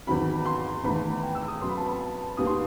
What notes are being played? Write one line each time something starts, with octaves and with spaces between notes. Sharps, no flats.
E2 D#3 F#3 B5
C6
E2 D#3 A3 B5
G5
E6
D#6
F#2 F#3 B3 C6
B5
A5
B5
A5
D#2 D#3 G3 B3 D#6
C6